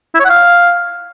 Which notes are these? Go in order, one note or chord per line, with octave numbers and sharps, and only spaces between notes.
E4
C#5
F#5
F5